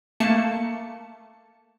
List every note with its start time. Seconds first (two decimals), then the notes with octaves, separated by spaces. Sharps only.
0.20 A3 A#3 A5 C#7